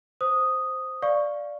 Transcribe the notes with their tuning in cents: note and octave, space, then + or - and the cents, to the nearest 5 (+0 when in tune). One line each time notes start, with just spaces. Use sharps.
C5 +0 D#6 +0
D5 +0 F5 +0 C#6 +0